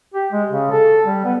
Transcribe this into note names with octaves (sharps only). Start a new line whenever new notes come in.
G4
G#3
C#3
A4
G3
B3